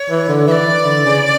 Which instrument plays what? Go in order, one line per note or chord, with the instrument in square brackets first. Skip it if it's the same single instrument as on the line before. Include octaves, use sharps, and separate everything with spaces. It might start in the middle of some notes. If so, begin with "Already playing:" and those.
Already playing: [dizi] C#5
[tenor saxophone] E3
D3
[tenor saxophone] E3 [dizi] D5 E5
[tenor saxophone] E3
D3
C#3